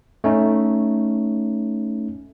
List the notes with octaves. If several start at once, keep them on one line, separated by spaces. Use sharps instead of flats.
A3 C#4 D#4